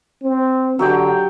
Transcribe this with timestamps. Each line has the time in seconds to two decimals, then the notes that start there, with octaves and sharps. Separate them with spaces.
0.22 C4
0.79 D3 F#3 G4 G5